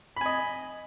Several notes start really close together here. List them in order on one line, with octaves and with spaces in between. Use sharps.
B5 G#5 D#5